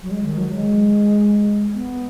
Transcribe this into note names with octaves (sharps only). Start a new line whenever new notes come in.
F#3
G#3
D#3
F#3
G#3
B3